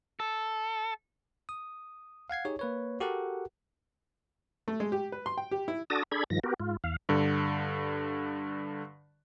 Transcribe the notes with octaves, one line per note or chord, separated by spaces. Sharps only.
A4
D#6
F5 F#5 G#6 C7
D#4 G4 G#4 C#5
A#3 B4 C#5
F#4 G4 A4 A#4 F#5
A3
G#3
G4
B4
C6
G5
G4
E4
D4 F#4 A4 A5 D#6 A#6
D4 G#4 A4 B5 G#6
G2 D#3 F3 A#6
B3 F#4 G4 A#4
G#2 F4
E2 F5
G2 D3